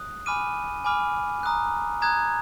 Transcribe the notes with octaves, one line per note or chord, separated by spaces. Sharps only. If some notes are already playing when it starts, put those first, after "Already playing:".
Already playing: D#6 F#6
G#5 B5 D6 F6 D#7
G#5 B5 D6 F6
A#5 D#6 F#6
A#5 D#6 F#6 G#6